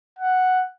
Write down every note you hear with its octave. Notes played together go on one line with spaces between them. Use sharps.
F#5